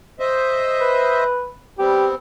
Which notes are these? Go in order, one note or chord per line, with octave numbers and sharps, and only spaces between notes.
C5 D#5 E5
B4
G3 B3 C4 G4